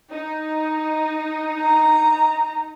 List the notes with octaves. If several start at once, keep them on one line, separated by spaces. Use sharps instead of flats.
D#4
A#5